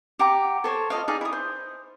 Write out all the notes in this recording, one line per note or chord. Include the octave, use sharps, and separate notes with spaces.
G4 F#5 A#5 D6
A4 C5 C#5
F4 A4 D#5 F5
D#4 G#4 D5 F5
E4 D#6
C5